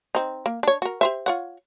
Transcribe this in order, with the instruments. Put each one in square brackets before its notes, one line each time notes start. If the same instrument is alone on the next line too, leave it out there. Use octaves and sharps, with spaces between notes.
[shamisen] C4 D#4
A#3
D4 C#5
F#4 A#4
G4 C5 E5
F4 C#5 F#5